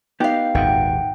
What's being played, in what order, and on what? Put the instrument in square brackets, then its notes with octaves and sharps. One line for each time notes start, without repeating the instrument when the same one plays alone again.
[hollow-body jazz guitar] B3 D#4 [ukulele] G4 F5
[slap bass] G#1 D#2 A#2 [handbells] F#5 G5